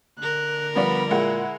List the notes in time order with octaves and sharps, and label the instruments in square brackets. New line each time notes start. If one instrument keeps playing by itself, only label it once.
[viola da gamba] D3 A#4 [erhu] F#6
[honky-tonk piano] F3 G3 D5 [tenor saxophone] B3 [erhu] B5
[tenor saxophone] A#2 [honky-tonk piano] G#3 F#5 [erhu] E4